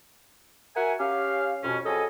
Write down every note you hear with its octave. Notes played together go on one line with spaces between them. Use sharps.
F#4 A#4 E5 F#5 G#5
C#4 G4 F5
F2 B2 C#4
F2 F#3 G#4 A4 D#5 G#5